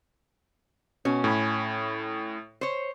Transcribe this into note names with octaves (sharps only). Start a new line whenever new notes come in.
B2 C#4
A2 B5
C5 C#5